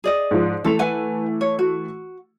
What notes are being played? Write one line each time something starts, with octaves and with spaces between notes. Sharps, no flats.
G#4 D5 D#5
G#2 F3
E3 A3 A4 F7
B4 F#5 G#5
C#5
F#4